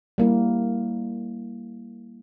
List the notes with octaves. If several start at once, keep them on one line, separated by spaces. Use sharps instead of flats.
G3 A#3 E4